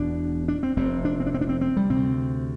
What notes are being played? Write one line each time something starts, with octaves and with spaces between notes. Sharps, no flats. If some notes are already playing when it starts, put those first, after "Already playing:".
Already playing: E1 E2 B2 D4
D4
C4
F1 F2 C3 C4
D4
C4
D4
C4
D4
C4
C4
G3
D2 C3 C4